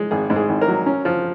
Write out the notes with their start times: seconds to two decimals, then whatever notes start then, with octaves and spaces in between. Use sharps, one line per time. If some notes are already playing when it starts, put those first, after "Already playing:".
Already playing: G#3
0.11 G#1 G#4
0.30 G#2
0.36 G#4
0.49 G#1
0.61 A#4
0.68 F#3
0.86 C#4
1.05 F3